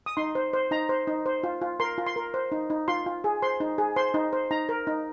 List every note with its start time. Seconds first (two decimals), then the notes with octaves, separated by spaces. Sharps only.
0.06 D#6
0.17 D#4 C6
0.35 C5
0.53 C5
0.71 D#4 A#5
0.89 C5
1.07 D#4
1.26 C5
1.43 F4
1.61 F4
1.80 A#4 C6
1.98 F4
2.06 C6
2.16 A#4
2.34 C5
2.52 D#4
2.70 D#4
2.88 F4 C6
3.06 F4
3.24 G#4
3.42 C5 C6
3.60 D#4
3.78 G#4
3.96 C5 C6
4.14 D#4
4.33 C5
4.51 D#4 A#5
4.69 A#4
4.87 D#4